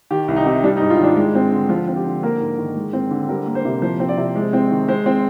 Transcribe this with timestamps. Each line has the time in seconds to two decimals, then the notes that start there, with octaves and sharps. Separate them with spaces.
0.11 D#3 G4
0.28 C2
0.36 D#4
0.46 C3
0.64 G3 D4
0.77 D#4
0.81 G#2
0.90 F4
0.99 D#3 D4
1.16 G#3
1.35 C4
1.52 D3
1.69 F3 F4
1.88 C4
1.96 G4
2.06 D3
2.23 A#3 A#4
2.40 G#2
2.58 D#3
2.76 G#3
2.93 C4
3.11 D3
3.29 G3 A#4
3.46 A#3
3.55 C5
3.65 C3
3.82 F3 C5
4.00 C4
4.09 D5
4.17 C3
4.35 G#3
4.53 C4
4.71 D#3
4.88 G#3 C5
5.06 C4